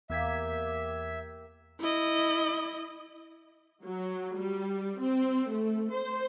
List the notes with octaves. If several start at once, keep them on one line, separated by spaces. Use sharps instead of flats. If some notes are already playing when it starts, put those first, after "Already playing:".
E2 A#3 G4 E5 G#6 B6
E4 D#5
F#3
G3
C4
A3
C5